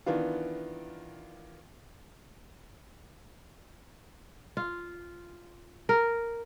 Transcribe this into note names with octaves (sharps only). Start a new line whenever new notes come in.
D#3 E3 B3 D4 F4
F4
A#4